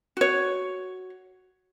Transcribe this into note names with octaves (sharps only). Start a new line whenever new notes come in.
F#4 C#5